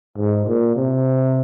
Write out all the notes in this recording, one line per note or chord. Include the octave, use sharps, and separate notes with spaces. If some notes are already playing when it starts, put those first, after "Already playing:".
G#2
A#2
C3